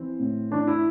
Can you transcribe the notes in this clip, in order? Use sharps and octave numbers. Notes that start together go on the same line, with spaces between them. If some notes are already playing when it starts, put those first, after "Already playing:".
Already playing: E3 C4
A2
E3 D4
E4